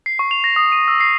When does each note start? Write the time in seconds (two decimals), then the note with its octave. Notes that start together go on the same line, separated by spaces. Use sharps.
0.06 C7
0.19 C#6
0.31 F7
0.44 A#6
0.56 D#6
0.72 D#7
0.88 E6
1.00 C7